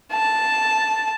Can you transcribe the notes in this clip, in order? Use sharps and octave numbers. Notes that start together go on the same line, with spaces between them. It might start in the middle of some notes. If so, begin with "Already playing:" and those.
A5